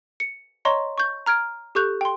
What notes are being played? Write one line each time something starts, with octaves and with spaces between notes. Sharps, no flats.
C#7
C#5 D#5 A#5 C6 C#6
C#6 G6
A#5 F6 G#6 D7
G4 A4 C#6 F#6 G6 F7
G5 C6